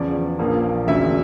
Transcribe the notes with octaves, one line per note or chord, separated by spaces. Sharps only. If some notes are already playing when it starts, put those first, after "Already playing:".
Already playing: E2 C#3 F3 D5
A#1 A#2 F3 A#3
E1 D2 C#3 E5